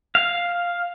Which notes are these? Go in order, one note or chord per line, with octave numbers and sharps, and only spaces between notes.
F5